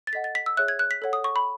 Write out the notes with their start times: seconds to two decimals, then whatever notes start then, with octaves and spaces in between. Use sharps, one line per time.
0.07 A6
0.13 A4 D#5 F#5 B6
0.24 A6
0.35 B6
0.46 E6
0.57 G#4 C#5 E5 F#6
0.68 G#6
0.79 F#6
0.91 B6
1.02 A4 C#5 F#5
1.13 D#6
1.24 C#6
1.36 B5